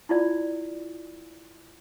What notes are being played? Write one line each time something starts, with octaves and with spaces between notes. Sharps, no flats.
E4 F4 D5